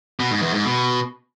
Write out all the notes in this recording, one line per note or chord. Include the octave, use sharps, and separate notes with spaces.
B2
G#2
E2
G#2
B2